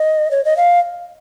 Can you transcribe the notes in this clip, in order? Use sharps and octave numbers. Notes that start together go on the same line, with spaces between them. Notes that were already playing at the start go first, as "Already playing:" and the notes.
Already playing: D#5
C#5
D#5
F5